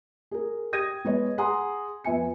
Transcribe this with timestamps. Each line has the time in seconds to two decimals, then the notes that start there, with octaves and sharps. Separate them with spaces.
0.31 G#4 A#4
0.73 G4 D#6 G#6 A#6 D#7
1.05 G#3 B3 C#5 D#5
1.38 G#4 F#5 G#5 A#5 C6 D#6
2.04 F2 B3 E5 G#5 C#7